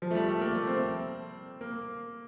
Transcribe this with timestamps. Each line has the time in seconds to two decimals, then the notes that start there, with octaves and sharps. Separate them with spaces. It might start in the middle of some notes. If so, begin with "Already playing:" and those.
0.02 F3
0.11 A3
0.15 G3
0.28 A3
0.41 A#3
0.55 A3
0.67 C4
1.61 A#3